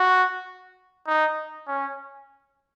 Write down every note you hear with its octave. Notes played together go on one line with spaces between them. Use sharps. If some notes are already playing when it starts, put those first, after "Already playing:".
Already playing: F#4
D#4
C#4